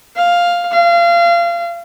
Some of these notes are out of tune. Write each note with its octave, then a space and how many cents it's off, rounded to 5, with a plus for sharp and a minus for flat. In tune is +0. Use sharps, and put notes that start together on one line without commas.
F5 +5
F5 -30